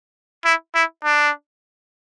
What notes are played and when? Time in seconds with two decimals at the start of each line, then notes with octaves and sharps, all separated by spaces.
0.45 E4
0.75 E4
1.04 D4